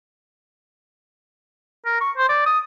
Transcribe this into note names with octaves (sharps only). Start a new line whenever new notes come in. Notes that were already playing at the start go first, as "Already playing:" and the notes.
A#4
C#6
C5
D5
D#6